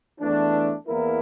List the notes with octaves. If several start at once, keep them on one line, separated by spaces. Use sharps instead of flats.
E2 E3 A3 D4
E2 E3 A#3 E4 A#4